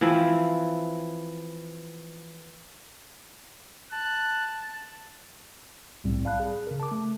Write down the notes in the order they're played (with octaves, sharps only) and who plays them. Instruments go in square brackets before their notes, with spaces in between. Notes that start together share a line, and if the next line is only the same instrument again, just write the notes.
[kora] E3 F3 C4 E4
[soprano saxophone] A5 [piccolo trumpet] F#6
[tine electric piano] C2 A2 G3 C4
D5 F5 A5 B5 F#6
G#4
C#3 A#4
A5 D6
A3